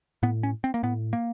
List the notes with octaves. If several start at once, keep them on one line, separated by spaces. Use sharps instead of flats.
A2 B3
C#4
C4
A#3
A2 B3
A#3